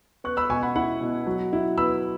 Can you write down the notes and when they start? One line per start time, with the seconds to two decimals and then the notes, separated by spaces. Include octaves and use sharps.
0.24 B3 C#6 F#6
0.37 B5 E6
0.49 B2 G#5 C#6
0.63 F#5 B5
0.76 E4 F#5 B5
1.01 B2
1.27 F#3
1.53 E4
1.78 B3 B5 E6